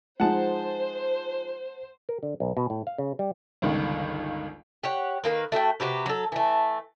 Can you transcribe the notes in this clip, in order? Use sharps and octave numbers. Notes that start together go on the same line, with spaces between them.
F3 G#3 D#4 C5 F#5 A5
A#4
D3
B1
B2
A2
F5
C#3
G3
G1 C#2 D#3
G4 C#5 F#5
D#3 A#3 B4
A3 F#4 G4 G5
C3 F#4 G4 B4
F#3 A4
E3 A3